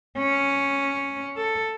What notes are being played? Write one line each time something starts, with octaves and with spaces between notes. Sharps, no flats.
C#4
A4